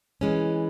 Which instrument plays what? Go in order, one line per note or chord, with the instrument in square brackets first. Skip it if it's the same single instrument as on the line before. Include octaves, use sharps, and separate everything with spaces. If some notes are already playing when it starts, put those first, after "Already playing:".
[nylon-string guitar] E3 G#3 C#4